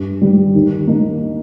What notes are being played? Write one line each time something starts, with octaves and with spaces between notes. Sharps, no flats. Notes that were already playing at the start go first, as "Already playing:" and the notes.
Already playing: G2
D#3 G3
D#2
D#3 A#3 D#4